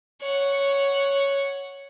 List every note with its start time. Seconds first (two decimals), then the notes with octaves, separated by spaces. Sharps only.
0.22 C#5 F#5